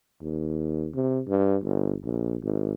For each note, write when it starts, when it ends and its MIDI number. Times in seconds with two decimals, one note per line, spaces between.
0.22 0.88 39
0.95 1.20 48
1.28 1.56 43
1.63 1.95 31
2.04 2.36 34
2.43 2.73 32